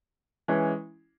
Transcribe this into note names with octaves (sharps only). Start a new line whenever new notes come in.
E3 G#3 C#4